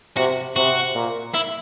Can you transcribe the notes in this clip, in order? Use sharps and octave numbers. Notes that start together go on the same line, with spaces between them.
C3 F#4
C3 F#4
A#2
E4